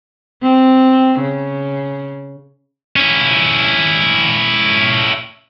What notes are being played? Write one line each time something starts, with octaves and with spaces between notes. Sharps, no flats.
C4
C#3
C#4 E4